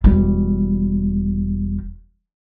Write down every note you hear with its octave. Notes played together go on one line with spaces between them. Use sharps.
E1 G3